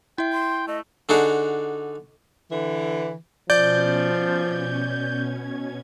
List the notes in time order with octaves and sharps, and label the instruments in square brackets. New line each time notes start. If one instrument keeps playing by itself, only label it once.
[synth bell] E4 E5 [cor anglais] G5
[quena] C6
[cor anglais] A3 [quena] D#5
[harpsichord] D3 D4 D#4 F#4 G#4
[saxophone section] D3 E3
[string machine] B2 C#4 G#6 [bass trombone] F3 [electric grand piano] D5 [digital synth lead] G6